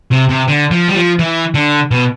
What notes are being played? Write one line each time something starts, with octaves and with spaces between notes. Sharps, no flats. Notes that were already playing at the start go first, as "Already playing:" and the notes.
C3
C3
D3
F3
G3
F3
E3
D3
B2